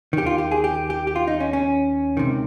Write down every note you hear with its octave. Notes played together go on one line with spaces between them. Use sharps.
D#2 D#3 G4
F4
G4
G#4
G4
G4
G4
F4
D#4
C#4
C#4
C#2 C3 D#3